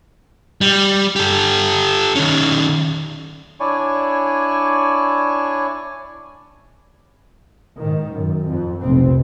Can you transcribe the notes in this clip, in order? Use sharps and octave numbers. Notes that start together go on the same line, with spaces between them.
G3
G4 A4
D#3 C#4
D4 E4 C#5 D5 G#5 C#6
G#2 D#3
F#2
F2
F1 B1 B2 C4